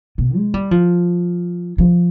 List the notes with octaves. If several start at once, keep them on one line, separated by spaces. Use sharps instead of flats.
B2
G#3
G3
F3
F3